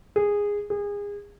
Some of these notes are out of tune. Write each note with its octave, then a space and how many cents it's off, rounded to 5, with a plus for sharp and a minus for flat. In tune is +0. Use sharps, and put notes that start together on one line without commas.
G#4 -15
G#4 -30